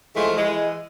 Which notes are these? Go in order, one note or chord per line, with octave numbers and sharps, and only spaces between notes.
E3 F3 G#3 A3
E3 G#3